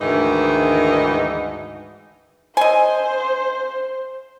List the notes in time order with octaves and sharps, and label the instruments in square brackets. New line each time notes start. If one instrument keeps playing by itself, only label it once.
[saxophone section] D2 G#2 D#3 E3 D#4 D#5
[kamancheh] C5 [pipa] D#5 G#5